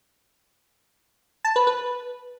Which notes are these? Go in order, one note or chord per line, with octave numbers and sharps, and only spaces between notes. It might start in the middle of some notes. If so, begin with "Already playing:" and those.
A5
B4
B4